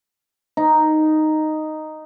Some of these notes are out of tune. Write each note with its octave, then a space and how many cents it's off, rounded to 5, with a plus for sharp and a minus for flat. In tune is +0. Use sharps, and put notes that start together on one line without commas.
D#4 -5